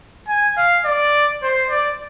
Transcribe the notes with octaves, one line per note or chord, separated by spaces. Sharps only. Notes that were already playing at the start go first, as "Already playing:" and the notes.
G#5
F5
D5
C5
D5